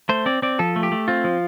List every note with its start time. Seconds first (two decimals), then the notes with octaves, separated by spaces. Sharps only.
0.09 A3 C5
0.26 C4 D5
0.42 C4 D5
0.59 F3 A4
0.76 A3
0.83 G4
0.92 A3
1.08 C4 F4
1.24 F3